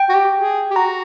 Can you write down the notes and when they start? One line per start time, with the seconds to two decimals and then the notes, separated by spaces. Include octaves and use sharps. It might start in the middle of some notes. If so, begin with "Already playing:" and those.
Already playing: G5
0.09 F#4
0.14 G4
0.35 G#4
0.70 G4
0.76 F#4 A#5